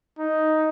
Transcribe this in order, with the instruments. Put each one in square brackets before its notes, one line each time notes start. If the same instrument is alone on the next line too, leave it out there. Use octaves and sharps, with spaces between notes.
[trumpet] D#4